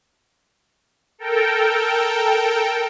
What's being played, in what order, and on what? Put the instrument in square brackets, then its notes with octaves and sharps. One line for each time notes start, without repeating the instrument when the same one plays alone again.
[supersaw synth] A4 A#4 G5